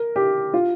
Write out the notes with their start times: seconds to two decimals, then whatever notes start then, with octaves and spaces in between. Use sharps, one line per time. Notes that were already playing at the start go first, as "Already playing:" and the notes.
Already playing: A#4
0.16 G4
0.54 F4